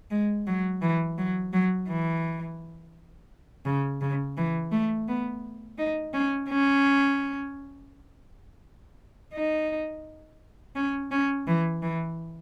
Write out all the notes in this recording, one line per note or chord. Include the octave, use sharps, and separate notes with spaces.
G#3
F#3
E3
F#3
F#3
E3
C#3
C#3
E3
A3
B3
D#4
C#4
C#4
D#4
C#4
C#4
E3
E3